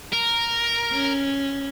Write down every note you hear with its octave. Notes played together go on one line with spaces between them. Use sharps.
A#4
C#4